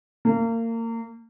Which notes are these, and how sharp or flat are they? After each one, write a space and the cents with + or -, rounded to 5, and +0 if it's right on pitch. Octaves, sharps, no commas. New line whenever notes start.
A#3 -30